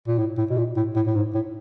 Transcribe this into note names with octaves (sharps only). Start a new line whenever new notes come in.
A#2
A2
A2
B2
A#2
A2
A2
A2
G#2
A2